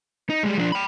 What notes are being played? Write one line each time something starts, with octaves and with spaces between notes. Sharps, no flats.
D#4
G3 G#3
F3 D4
G5 B5